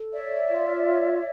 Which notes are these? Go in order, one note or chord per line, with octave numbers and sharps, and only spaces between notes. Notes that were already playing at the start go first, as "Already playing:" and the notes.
Already playing: A4
C#5 D5 E5
F4
C#5